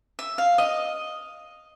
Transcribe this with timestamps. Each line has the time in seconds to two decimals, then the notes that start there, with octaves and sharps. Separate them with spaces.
0.19 E5
0.38 F5
0.58 D#5